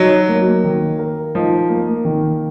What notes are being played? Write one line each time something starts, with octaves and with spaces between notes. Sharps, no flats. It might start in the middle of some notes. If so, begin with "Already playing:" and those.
Already playing: F#3 D#4
A#3
D#3
A#4
F3 D#4
A#3
D#3